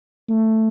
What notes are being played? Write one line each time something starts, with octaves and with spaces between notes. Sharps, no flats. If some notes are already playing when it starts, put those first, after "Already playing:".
A3